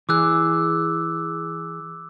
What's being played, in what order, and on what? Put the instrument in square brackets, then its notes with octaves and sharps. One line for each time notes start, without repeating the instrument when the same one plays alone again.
[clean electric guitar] E3 G#4 [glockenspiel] D6 E6 F#6